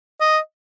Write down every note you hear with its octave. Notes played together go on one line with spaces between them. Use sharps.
D#5